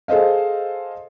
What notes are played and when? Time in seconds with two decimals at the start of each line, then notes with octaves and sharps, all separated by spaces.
0.08 G#4 A4 C5 D#5 F5